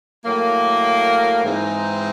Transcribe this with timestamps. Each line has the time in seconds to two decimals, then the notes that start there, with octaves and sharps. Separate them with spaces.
0.25 A2 F#3 A#3
1.43 G#2 E3 G#3 C4 D#4